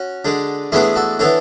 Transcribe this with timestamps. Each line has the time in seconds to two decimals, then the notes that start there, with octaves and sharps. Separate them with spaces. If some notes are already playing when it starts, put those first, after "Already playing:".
Already playing: C#4 F#4
0.25 D3 G#3 D4
0.72 A2 E3 G#3 B3 D4 E4 G#4
0.96 F#4 A4
1.19 E3 B3 D4 A4 C#5